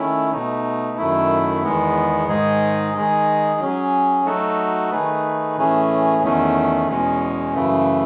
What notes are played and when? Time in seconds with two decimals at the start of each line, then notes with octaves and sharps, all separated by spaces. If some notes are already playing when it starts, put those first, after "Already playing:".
Already playing: D#3 A3 C#4 E4
0.32 B2 A3 D#4
0.97 F#2 D#3 A3 E4
1.63 E2 D#3 G#3 B3
2.28 G#2 D#3 G#3 D#4 G#4
2.94 D#3 G#3 D#4 G#4
3.60 F#3 C#4 G#4
4.25 F#3 A3 D#4 F#4 A4
4.91 D#3 A3 D#4 G#4 B4
5.57 A2 E3 A3 C#4 G#4
6.23 E2 D#3 A3 C#4
6.89 E2 B2 G#3 C#4
7.54 F#2 C#3 E3 A3